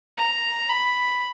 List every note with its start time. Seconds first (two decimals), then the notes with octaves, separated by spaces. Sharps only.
0.17 A#5
0.68 B5